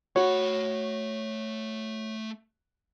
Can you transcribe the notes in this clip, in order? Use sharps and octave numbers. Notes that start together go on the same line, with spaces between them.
A3 F#4 C#5 B5